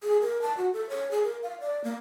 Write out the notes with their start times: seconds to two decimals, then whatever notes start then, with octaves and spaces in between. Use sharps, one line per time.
0.03 G#4
0.21 A#4
0.42 A5
0.57 F#4
0.73 A4
0.89 C#5
1.11 G#4
1.24 A#4
1.43 F5
1.60 D5
1.84 A#3